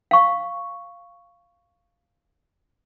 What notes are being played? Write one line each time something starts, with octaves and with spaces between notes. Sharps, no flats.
F5 C#6